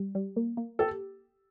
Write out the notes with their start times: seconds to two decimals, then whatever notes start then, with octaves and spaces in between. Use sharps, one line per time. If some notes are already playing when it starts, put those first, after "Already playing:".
Already playing: G3
0.15 G3
0.36 A#3
0.57 A#3
0.79 G4 A4